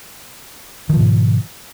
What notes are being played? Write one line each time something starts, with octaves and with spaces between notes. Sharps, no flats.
G#2 B2 D#3 F3